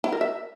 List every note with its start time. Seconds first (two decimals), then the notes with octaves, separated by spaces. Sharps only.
0.04 E4
0.12 A#4
0.21 E5